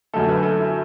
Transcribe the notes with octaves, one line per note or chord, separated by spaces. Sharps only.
F#2 D3 A3 A4
B4
A4
E4